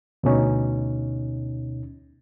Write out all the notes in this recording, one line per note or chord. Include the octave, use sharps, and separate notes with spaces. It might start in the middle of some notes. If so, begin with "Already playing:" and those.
D2 B2 C#4 D#4